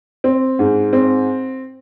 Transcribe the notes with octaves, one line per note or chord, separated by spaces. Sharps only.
C4
G#2
C4